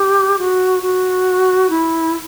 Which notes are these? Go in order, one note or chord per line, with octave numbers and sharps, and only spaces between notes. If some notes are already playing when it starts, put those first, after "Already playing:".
Already playing: G4
F#4
F#4
E4